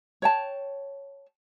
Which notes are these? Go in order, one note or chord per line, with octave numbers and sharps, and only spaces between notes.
C#5 G5 A5